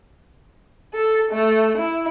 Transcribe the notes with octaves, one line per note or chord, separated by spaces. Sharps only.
A4
A3
E4